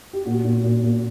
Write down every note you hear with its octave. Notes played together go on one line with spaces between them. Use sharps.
G4
A#2 F#4
A#2
A#2
A#2